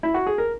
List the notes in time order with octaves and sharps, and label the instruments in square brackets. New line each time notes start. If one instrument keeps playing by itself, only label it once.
[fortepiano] E4
F#4
G#4
A#4